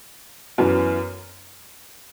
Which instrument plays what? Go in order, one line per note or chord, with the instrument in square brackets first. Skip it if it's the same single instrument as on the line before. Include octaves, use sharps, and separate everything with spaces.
[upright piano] F#2 E3 B3